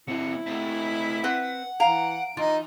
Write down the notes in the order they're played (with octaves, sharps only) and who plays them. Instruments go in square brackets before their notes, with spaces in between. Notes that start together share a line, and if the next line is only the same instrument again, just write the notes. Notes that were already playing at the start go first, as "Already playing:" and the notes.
[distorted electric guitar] F#3 C4 [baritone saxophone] E4 [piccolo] C#7
[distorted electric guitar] A3 C4 [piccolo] B6
[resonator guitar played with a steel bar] C4 B4 [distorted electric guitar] F#5
[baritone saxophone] E3 [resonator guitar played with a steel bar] F5 A#5 [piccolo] D7
[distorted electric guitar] E3 [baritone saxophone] D#4 [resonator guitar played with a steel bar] F4